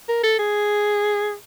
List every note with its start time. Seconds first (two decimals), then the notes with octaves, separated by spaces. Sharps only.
0.09 A#4
0.24 A4
0.39 G#4